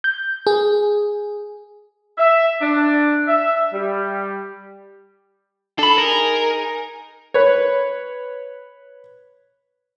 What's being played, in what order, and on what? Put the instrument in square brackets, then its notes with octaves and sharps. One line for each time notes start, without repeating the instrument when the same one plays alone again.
[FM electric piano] G6
G#4
[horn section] E5
D4
E5
G3
[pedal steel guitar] D4 B5 [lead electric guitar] A4
[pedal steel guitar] D#4 G#4 [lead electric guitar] A#4
[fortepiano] B4 C#5